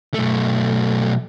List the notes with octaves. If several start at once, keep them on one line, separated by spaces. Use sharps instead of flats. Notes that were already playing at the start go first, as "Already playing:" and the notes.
B1 A3